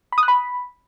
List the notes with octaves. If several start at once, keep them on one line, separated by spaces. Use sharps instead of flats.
B5
D#6
F#6
B5